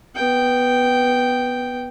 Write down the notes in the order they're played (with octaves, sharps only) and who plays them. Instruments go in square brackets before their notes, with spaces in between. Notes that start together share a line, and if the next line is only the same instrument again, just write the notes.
[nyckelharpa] B3 G5